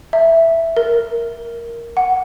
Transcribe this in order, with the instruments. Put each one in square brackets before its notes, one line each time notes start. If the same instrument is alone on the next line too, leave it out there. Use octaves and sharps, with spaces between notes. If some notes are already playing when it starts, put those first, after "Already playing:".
[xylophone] E5
A#4
F#5